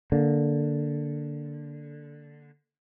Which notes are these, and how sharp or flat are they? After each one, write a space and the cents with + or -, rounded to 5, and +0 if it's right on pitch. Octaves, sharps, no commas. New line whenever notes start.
D3 +0 A#3 +0